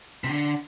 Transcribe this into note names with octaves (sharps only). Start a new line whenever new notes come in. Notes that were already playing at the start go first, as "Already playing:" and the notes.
C3
D3